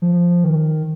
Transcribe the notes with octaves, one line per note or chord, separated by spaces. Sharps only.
F3
D#3